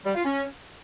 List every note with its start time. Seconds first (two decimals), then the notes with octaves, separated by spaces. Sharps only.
0.06 G3
0.15 F4
0.25 C#4